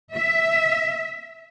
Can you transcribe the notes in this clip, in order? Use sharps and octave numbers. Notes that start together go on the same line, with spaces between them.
E5